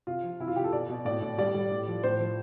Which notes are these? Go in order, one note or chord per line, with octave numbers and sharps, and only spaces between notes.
C3 F4
F3
C3 E4
F4
C3 G4
A4
B2 D5
B2
A2 D5
A2
G3 D5
G3
A2
F3
A2 C5
F3